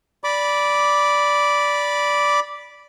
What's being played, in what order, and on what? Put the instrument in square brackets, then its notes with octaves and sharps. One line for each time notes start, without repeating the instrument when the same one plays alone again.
[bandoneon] D5 B5 D6